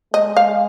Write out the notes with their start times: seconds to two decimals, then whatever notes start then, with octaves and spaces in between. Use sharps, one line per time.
0.14 G#3 D#5
0.37 F5